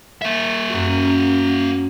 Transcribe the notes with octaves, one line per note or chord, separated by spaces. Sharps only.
A#3 E5
F#2 F#4